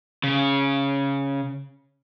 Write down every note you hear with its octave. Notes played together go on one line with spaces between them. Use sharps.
C#3